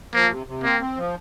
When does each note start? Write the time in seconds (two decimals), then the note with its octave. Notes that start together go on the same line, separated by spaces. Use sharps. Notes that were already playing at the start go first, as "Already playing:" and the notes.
0.14 F3 A#3
0.31 C3
0.47 C3
0.63 A#3 C4
0.80 C4
0.97 F3